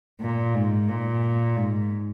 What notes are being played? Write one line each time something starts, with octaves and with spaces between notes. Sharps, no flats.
A#2
G#2
A#2
G#2